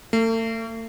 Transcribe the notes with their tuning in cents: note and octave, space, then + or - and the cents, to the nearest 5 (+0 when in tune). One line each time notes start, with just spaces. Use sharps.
A3 +40